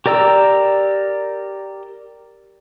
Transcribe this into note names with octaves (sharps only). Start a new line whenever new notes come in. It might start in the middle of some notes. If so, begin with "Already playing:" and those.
G4 A#4 D5 A#5 E6